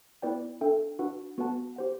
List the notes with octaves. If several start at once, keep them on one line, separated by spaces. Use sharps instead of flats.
B3 E4 B4 D5 G5
D4 A4 E5 G5
D4 F#4 B4 F#5
B3 F#4 B4 F#5 A5
G4 C5 F#5